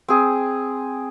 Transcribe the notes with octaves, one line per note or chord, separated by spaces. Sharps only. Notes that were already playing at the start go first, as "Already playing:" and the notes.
C4 G#4